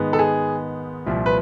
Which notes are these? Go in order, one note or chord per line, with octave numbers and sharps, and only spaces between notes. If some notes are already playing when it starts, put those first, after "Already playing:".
Already playing: G#2 D#3 G#3 B3
A4
G#4
C2 A#2 F3
B4